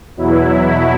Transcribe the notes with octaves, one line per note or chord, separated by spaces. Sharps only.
E2 B2 F#3 E4